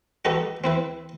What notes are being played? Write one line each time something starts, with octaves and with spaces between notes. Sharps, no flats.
D#4 F#4 G4 A4 B4
C4 E4 B4